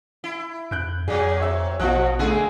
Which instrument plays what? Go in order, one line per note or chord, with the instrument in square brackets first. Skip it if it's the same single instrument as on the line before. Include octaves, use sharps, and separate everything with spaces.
[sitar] E4
[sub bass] F2 [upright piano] F#6 G6 D7
[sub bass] F2 [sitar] A#2 F#3 [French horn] G#4
[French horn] C4 [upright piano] C#5 E5 E6
[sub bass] A#1 [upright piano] B2 F#6 [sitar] F3 [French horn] F#4
[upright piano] D3 A3 [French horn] D#3 [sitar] A#3 G#4